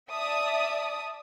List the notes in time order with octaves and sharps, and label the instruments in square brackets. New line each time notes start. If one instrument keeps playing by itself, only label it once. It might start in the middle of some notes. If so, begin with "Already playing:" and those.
[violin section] D5 E5 A5 D#6